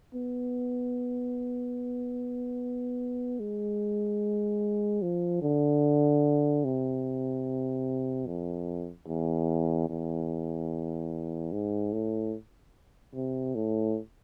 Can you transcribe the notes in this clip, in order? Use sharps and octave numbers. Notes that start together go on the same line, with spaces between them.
B3
G#3
F3
D3
C3
F2
E2
E2
G#2
A2
C3
A2